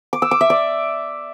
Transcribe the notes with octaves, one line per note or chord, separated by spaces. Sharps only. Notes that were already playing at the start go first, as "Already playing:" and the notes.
D6
E6
D6
E5
D5